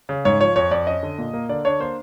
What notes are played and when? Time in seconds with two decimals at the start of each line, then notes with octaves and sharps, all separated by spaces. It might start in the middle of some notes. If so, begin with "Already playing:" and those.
0.09 C#3
0.25 G#2 C#5
0.40 F3 C#5
0.56 F2 C#5
0.71 F2 D5
0.87 C#4 D#5
1.03 D3
1.18 A#2
1.34 A#3
1.49 D3 D5
1.65 D4 C#5
1.80 A#3 C5